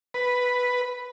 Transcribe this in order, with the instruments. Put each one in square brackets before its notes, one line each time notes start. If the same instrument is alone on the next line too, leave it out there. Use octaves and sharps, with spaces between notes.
[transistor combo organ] B4